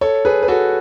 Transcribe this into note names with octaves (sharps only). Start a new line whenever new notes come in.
A4 C#5
G#4 B4
B4
F#4 A4